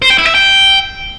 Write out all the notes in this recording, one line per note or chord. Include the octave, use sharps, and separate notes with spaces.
C5
G5
E4
E5
G5